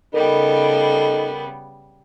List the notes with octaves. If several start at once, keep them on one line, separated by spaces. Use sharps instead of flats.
C#3 G3 B3 D#4 A4 A#4